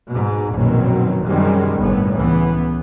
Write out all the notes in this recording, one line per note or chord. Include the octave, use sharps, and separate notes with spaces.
G#2 B2
A#1 F#2 B2 D#3 F#3 C4
F#2 C3 D#3 G3 G#3
G1 A2 B3
C#2 E3 B3